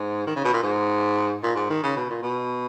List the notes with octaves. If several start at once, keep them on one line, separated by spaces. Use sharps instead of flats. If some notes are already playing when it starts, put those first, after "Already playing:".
Already playing: G#2
D#3
C#3
B2
A#2
G#2
A#2
G#2
D#3
C#3
B2
A#2
B2